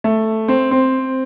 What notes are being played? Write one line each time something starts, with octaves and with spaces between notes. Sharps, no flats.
A3
C4
C4